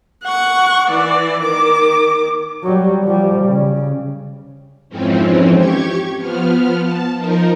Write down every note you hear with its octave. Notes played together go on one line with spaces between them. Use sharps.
F#5 C#6
E3 D5
D#3 D6
F#3 G3
F3 G3
C#3
F2 G#2 E3 F3 C4 C#4
G4 C#6 G#6
F3 B3 F6
A5
F3 D#4 A#4